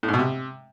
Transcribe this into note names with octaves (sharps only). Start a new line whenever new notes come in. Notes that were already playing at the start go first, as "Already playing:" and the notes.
A2
G#2
B2
C3